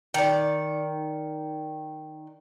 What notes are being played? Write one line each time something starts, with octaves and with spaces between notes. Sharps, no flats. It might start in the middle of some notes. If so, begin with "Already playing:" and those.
D#3 D5